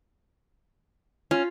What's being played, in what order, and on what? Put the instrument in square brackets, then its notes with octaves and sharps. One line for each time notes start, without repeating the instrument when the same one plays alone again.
[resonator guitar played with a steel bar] C#4 [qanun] F4